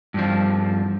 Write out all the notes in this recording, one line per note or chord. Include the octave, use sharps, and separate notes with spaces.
G2 F3